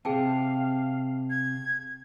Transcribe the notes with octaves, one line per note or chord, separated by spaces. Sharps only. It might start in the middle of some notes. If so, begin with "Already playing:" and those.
C3 C4 G#4 F5 G5 A5
G#6